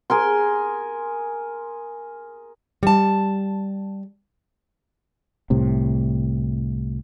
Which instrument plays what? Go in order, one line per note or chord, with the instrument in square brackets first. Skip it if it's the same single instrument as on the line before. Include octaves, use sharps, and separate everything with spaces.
[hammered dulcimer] G#4 A#4 C6
[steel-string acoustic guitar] G3 A5
[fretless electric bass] C2 A2 C3